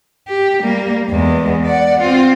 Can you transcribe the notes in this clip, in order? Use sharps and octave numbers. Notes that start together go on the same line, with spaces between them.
G4
G3 A#3
E2 G#3
D5 F#5
C4 F4